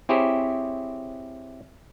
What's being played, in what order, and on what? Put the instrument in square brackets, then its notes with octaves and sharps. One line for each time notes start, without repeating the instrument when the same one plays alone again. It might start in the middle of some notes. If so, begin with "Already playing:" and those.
[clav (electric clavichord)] C4 E4 G4 G#4 C5 C#5